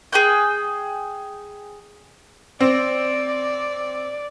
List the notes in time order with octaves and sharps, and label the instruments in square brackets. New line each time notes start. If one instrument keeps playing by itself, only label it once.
[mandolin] G#4 G5 F#6 G6
[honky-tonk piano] C4 [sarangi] D5